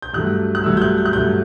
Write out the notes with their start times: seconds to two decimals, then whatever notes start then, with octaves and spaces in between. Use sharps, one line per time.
0.02 G6
0.13 G2 F#3 A3 F#6
0.55 F#6
0.64 G2 F#3 A3 E6
0.77 G6
0.82 F#6
0.98 G6
1.06 F#6
1.13 G2 F#3 A3 G6